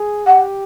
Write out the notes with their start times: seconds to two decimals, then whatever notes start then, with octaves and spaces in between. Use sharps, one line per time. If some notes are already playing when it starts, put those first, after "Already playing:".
Already playing: G#4
0.26 G4 F#5